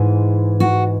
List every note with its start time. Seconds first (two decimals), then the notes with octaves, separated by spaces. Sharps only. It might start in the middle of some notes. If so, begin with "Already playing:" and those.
Already playing: G#2 E3 G#3
0.60 F#4